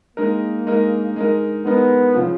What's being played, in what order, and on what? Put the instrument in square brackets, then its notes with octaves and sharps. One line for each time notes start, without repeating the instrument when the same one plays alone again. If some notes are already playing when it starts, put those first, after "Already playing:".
[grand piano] G#3 D#4 A#4 [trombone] A#3
[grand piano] G#3 D#4 A#4
G#3 D#4 A#4
[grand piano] G#3 D#4 A#4 [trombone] B3
[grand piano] C#3 F3